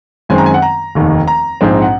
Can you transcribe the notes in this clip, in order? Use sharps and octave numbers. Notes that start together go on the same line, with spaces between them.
F#2 D#3 G#3 C4 G#5
A#5
G#5
F#5
A#5
F1 D#2 D#3
A#5
A#1 G#2 F3 C4
F#5